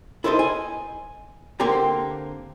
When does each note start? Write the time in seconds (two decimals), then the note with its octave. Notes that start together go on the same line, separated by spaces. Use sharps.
0.24 E4 A4 A#4 C5 D5 D#5
0.39 G#5
1.60 D3 A#3 C4 G4 A#5